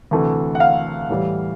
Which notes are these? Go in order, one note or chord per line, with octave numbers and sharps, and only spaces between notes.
D2 C3 E3 A3
F#5
F5
A2 E3 G3